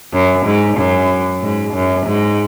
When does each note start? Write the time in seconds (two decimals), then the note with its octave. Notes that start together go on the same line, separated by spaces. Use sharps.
0.13 F#2
0.46 G#2
0.77 F#2
1.42 G#2
1.74 F#2
2.06 G#2